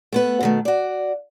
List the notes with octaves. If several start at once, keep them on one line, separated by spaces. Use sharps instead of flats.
A3 B3 B4
B2 D#3 A3
F#4 D5